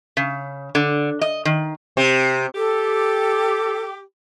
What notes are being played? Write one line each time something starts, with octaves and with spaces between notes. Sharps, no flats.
C#3
D3
D#5
D#3
C3
G4 A4